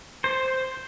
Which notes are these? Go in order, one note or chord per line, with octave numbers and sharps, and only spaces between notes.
C5